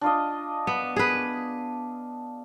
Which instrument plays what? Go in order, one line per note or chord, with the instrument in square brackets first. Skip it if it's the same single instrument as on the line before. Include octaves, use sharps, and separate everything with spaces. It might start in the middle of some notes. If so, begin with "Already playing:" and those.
[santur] D4 F4 D#5
[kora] B3
G#4 B4